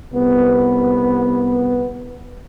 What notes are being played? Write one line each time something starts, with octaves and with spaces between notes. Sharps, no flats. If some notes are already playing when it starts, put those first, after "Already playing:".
C2 B3